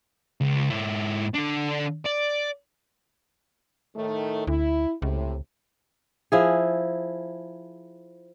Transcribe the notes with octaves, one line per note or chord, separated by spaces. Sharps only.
C#2
G#2 E4
D3 D4
D5
A2 D#3 A3
D2 E4
C#2 A2 C3
F3 E4 G#4